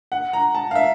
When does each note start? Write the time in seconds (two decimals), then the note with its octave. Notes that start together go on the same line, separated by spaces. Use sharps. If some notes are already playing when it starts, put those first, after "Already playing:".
0.12 F#5
0.33 A#5
0.55 A5
0.71 F5
0.75 E5